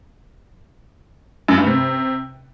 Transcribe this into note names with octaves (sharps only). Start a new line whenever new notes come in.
F#2
G2
C3